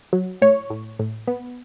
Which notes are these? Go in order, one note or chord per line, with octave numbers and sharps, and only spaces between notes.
F#3
A2 C#5
A2
A2
B3